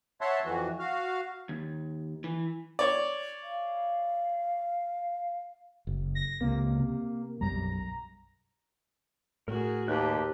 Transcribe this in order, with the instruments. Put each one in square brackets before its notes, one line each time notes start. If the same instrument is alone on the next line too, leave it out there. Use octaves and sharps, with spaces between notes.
[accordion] C#5 E5 F#5 A5 C6
F2 E3 F#4
F#4 F5
[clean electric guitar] D#2
E3
[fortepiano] C#5 D5
[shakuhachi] F5
[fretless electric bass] F#1
[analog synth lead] A#6
[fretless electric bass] C#2 C3 [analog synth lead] A#3
[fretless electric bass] C3
[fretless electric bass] B1 F#2 G3 [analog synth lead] A#5
[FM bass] A2 [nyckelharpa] F#4 G#4 [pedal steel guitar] A#4
[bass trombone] D#2 [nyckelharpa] G4 B4 [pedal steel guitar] A5 F#6